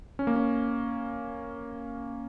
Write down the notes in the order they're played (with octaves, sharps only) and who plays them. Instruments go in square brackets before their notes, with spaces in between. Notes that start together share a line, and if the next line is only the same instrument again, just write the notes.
[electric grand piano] C#4
A#3
C#4